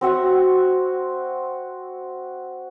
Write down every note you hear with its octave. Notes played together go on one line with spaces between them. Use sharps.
C4 F#4 E5 F#5